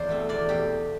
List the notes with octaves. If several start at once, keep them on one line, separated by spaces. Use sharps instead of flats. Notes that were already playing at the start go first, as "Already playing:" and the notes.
Already playing: E2 C5 D5
B2 A3 C4
E2 D5
B2 A3 G4